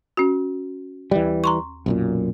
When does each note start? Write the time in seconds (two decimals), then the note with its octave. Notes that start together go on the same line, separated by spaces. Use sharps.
0.17 C#4 F#4
1.11 D#2 E3 G3
1.44 A#5 C6 C#6
1.86 B1 F#2 A#2